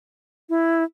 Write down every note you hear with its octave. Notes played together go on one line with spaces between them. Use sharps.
E4